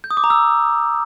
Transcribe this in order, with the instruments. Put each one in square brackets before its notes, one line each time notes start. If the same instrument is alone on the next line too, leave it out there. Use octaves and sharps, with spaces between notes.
[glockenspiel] G6
D#6
D6
A#5
E6